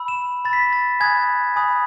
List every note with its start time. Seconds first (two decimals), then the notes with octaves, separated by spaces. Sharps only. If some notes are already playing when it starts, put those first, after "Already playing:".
Already playing: B5 E6
0.08 E7
0.45 B5 A6
0.49 E6 B6
0.62 A6
0.73 A6
1.00 G#5 B5 D#6 F#6 G#6
1.56 G#5 B5 D#6 F#6